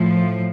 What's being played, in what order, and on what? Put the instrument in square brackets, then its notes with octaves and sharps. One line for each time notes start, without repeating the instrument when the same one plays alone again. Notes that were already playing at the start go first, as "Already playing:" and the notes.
Already playing: [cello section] A2 F3